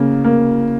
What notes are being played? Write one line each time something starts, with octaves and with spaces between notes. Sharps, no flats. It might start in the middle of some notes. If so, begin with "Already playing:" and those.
Already playing: C#3 A#3
A#3